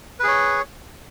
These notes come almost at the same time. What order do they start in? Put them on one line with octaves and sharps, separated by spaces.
B4 G#4 C#5